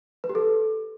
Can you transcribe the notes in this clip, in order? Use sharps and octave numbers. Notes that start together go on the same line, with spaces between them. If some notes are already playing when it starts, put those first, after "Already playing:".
B4
G4
A4